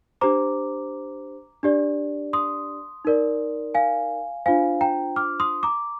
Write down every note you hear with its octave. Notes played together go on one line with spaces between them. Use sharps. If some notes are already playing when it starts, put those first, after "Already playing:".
D4 G4 C5 A#5 D6
D4 G4 D5
C6 D#6
D#4 A#4 D5
F5 G#5
D4 F4 C5 F5 G#5
G5 A#5
D6 F6
C6 D#6
A#5 D6